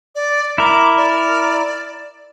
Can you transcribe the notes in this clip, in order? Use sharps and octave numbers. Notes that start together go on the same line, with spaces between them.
D5
E4 A#4 D6
D5